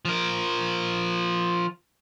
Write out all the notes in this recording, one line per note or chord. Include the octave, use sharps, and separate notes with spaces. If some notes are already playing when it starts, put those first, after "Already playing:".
F3 A#4